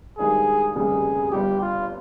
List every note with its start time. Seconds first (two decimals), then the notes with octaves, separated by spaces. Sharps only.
0.18 G2 D#3 G#3 D#4 G4 G#4
0.76 F1 D#2 C#3 G3 G#4
1.32 G1 G2 G3 G4
1.61 F4